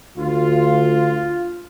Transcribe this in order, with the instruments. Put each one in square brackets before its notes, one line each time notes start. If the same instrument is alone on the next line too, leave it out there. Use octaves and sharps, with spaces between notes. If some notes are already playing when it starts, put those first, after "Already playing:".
[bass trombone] D2 [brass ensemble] F4